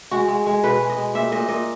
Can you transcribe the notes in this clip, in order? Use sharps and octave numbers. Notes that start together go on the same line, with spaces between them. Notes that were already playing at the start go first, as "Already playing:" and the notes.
G#3 F#4
G#3
G#3
B2 B4
G#3
D#5
G#3
A#2 E5
A#2 D#5
A#2 D#5